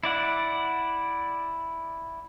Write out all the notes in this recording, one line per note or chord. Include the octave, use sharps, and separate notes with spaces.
E4 D5 F#5